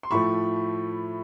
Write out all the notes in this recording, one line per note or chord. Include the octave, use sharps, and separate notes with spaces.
C6
A2 F3 A3 B5 C#6